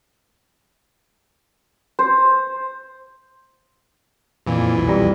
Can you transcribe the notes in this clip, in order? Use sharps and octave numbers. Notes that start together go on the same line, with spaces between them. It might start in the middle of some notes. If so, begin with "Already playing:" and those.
C5
F2 A#2 E3
B1 E3
F2 G3 A#5